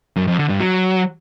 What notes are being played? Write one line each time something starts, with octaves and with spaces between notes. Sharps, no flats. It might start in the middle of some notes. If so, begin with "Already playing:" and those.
F#2
F2
D3
G2
F#3